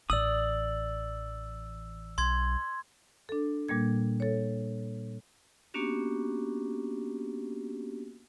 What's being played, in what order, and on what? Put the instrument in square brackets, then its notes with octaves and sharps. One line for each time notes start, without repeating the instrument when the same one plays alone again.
[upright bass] A1 E3 [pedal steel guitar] D5 D#6 [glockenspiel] E6 F#7
[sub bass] B1 [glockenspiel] C6 G#6
[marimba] D4 A4
A#2 G3 A#3 G#6
A4 C#5
[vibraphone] A#3 B3 C#4 D4 F#4 G4